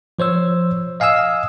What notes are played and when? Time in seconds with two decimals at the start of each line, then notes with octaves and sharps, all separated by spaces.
0.19 F3 C5 C#5 E6
1.00 D#5 F5 G#5 D#6 E6